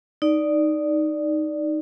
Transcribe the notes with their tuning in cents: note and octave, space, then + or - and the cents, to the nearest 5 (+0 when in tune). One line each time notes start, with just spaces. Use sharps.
D#4 +0 D5 +0